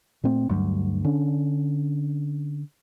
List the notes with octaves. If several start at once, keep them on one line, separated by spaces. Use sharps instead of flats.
A#2 A3 C4
D2 G2 F#3 G3
D3 C#4 D4